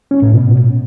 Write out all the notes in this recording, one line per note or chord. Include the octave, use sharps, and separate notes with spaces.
C#4
A2
B2